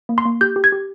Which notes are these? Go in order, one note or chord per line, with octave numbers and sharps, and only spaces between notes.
A#3
C6
A#3
G4 G6
G4
G#6
G4